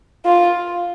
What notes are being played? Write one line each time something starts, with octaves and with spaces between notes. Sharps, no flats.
F4